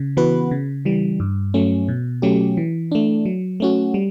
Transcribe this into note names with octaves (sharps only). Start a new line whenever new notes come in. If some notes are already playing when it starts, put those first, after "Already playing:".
Already playing: C#3
E3 B3 F#4 B4
C#3
E3 G3
G2
F#3 A3 C#4
B2
F#3 A3 C#4 G4
E3
A3 D4
F#3
A3 C#4 F#4
G3